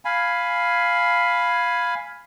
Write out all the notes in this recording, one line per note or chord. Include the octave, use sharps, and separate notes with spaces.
F5 G#5 B5